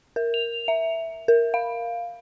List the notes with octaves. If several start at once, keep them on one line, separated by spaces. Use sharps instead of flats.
A#4
F7
E5
A#4
F5